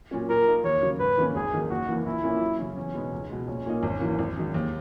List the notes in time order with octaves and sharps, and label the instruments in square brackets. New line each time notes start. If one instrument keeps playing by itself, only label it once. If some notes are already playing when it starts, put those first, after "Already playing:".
[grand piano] A#2 F#3 C#4
[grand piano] A#2 [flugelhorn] A#4
[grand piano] A#3 D#4
[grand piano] D#2 [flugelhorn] C#5
[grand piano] C#3 F#3 A#3
[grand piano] G#2 [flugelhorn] B4
[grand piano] D#3 A#3 C#4
[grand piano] G#1 [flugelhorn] G#4
[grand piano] F#2 D#3 A#3 D#4
[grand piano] F#1 [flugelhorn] F#4
[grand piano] F#2 E3 A#3
[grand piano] A#1 [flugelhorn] E4
[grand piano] A#2 A#3 C#4
F#2
C#3 F#3 C#4
[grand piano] E2 [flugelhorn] C#4
[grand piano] B2 G#3 B3 D#4
C#2
B2 G#3
[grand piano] A#1 [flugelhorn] C#4
[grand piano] A#2 A#3 D#4
G#1
F#2 E3 A#3
G#1
F#2 D#3 G#3
D#2